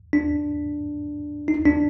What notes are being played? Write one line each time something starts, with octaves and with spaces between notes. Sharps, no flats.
D4
D#4
D4